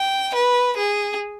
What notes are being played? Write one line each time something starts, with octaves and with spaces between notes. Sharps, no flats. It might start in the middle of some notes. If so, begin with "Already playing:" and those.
Already playing: G5
B4
G#4